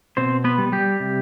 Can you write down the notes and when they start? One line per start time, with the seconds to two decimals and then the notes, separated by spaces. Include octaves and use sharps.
0.17 B2 C4 C5
0.44 B3 B4
0.58 G3
0.72 G3 G4
1.00 C3